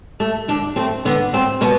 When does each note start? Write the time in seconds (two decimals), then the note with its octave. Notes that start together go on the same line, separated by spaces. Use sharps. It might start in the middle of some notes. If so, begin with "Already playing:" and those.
0.20 A3
0.48 D3 D4
0.76 A3 C4
1.05 D3 B3
1.33 A3 C4
1.61 B2 B3